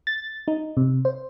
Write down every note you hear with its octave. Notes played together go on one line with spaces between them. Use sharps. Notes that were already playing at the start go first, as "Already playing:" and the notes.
A6
D#4
C3
C5